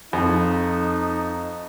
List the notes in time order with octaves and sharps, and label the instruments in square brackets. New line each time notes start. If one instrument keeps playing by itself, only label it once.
[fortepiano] F2 [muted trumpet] D#4